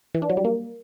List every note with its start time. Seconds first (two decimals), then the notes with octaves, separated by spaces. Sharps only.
0.14 E3
0.22 D4
0.30 F#3
0.37 G3
0.45 A#3